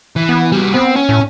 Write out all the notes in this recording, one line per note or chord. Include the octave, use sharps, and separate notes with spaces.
E3
B3
G3 F#4
B3 C4
C#4
A2